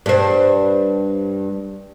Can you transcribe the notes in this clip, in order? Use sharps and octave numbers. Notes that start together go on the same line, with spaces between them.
G2 C5